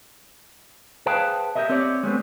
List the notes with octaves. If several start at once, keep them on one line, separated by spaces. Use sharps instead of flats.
G#4 B4 C5 F5 G5 A5
G4 A4 A#4 D#5 E5
C4 G4 C#5 D5
G#3 A3 B3 C4